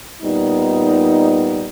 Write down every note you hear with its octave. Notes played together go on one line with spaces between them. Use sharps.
A#2 G3 B3 D#4